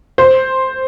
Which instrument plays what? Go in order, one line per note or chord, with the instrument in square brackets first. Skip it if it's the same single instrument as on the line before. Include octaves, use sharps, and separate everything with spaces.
[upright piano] C5